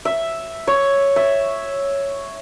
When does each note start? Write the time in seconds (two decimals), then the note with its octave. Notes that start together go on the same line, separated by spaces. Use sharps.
0.05 E5
0.67 C#5
1.16 E5